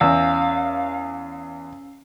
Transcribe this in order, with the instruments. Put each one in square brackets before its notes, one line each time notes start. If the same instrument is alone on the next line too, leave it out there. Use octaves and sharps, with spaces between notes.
[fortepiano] E2 [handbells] C#4 E6 [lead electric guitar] F5